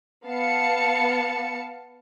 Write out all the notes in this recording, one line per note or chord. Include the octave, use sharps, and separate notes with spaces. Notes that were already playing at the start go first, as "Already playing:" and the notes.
B3 F5 A5 C#7